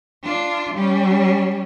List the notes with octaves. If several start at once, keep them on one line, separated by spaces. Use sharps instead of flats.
D4 F4
G3 C#4